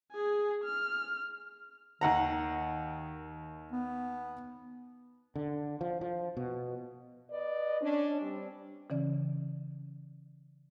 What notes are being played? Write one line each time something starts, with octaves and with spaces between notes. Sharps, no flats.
G#4 G#5
F6
D#2 D#3 F#5 A#5
B3
D3
F3
F3
B2
B4 D5 D#5
C#4 D4
G3 C4
C#3 E3 C#4 D5